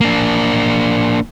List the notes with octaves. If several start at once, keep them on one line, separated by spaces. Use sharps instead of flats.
A#3 D4